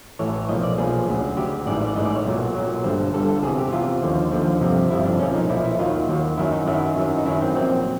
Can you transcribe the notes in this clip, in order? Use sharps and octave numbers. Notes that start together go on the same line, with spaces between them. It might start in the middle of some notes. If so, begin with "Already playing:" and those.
A1 A2 E3 C#5
C#5
B1 A#2 F3 D#5
D5
B1 A#2 F3 G#4
D2 C#3 F#3
D2 C#3 F#3 G4
A1 G#2 E3 D5
D5
A1 G#2 E3 D#5
D5
C#5
B1 A#2 F#3
B1 A#2 F#3
G1 G2 D3 C5
G1 G2 D3 A4
A4
E2 C3 E3 G#4
G4
E2 C3 E3 F4
D#2 D3 F3
D#2 D3 F3
G1 F2 C3 F3
G1 F2 C3 F3 E4
D4
B1 A#2 F3 C#4
D#4
B1 A#2 F3 E4
E4
D#2 D#3 F#3 F4
D#2 D#3 F#3
F#2 D#3 F#3 E4
D#4
F#2 D#3 F#3 E4
F#2 D#3 F#3
D#4
F#2 D#3 F#3 E4
C4
A#1 A#2 F#3 C4